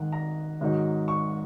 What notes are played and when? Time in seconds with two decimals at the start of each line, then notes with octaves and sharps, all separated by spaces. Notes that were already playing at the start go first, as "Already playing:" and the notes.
Already playing: G#2 D#3 G#3 D#4 F#5
0.12 A#5
0.61 G#2 D#3 F#3 D#4
1.08 C#6